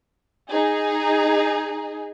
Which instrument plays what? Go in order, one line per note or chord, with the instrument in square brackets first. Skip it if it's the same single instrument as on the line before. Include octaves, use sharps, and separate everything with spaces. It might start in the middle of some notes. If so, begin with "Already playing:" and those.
[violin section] D#4 G#4